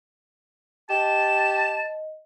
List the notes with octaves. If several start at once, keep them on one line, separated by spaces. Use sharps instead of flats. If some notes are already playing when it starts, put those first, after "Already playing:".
G4 D#5 A5 E7